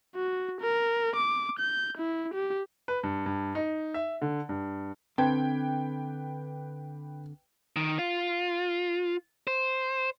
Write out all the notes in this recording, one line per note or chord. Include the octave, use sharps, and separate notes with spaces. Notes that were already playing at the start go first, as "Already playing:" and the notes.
F#4
A#4
D6
G6
E4
G4
B4
G2
G2
D#4
E5
D3
G2
D3 C4 B4 G5 A5 G#6
D#3
F4
C5